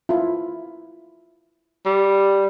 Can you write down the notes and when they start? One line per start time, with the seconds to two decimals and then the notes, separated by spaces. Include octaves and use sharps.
0.09 E4 F4
1.86 G3